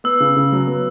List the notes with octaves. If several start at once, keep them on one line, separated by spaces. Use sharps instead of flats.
B3 E6
C#3
C#3
F#3
B3